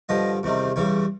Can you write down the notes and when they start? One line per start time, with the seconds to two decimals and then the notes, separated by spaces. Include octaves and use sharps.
0.09 G2 D3 F3 D#5
0.43 E2 C3 D#3 G3
0.76 E2 C#3 E3 G3 C#5